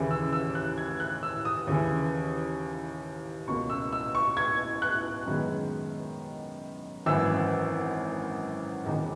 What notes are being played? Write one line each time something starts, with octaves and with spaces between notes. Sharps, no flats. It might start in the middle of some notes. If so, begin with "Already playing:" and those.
Already playing: D#2 C#3 E3
E6
E6
F#6
G#6
F#6
E6
D#6
D#2 C#3 E3
C#2 B2 A#3 C#6
E6
E6
C#6
G#6
F#6
F#2 D#3 G#3 B3
G#1 F#2 E3 E6
E1 E2 D#3